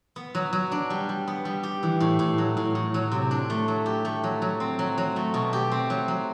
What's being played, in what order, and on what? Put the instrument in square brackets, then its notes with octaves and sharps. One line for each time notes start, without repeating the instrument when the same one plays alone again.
[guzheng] B3
F#3
F#3
D4
G3
G3
B3
G3
G4
E3
A2
A2
F#3
A2
A2
F#3
C3
D4
A3
F#3
G4
A3
F#3
F#3
C4
F#3
F#3
A3
B2
G4
C4
F#3
F#3